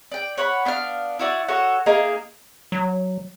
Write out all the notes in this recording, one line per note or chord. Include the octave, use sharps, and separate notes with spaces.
D5 G5
C#5 F#5 B5
B3 D4 F5 F6
E4 F#4 D5
F#4 A4 C#5 F#5
A#3 D#4 G#4 A#4
F#3